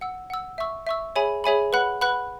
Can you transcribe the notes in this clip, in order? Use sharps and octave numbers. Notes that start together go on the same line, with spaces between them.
F#5 E6
F#5 E6
E5 C#6 E6
E5 C#6 E6
G#4 C#5 E5 G#5 B5
G#4 C#5 E5 G#5 B5
B4 F#5 B5 F#6
B4 F#5 B5 F#6